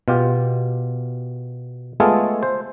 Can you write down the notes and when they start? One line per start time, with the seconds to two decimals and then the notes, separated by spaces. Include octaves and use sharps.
0.08 B2 F4 G4
2.00 G#3 A3 B3 F4 G#4 A4
2.43 C5